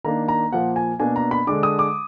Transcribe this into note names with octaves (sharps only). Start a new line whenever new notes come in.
D#3 A#3 D4 A#5
A#5
A#2 F3 A#3 F#5
G#5
B2 A#3 D4 G#5
A#5
B5
D3 G#3 D4 D6
D#6
D6